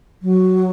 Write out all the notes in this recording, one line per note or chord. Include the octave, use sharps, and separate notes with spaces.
F#3